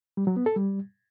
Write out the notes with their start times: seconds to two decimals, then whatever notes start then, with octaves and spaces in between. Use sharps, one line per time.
0.17 G3
0.27 F#3
0.37 B3
0.46 A4
0.56 G3